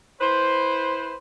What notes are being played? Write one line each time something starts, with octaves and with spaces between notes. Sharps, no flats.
E4 B4 C5